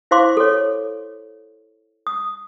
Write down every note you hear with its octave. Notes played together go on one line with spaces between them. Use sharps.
E4 C5 F5 C6 D6
A4 C#5
D#6